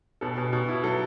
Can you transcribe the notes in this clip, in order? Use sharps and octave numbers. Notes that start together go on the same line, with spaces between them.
B2 A4
B2
B2
E4
F#3 A4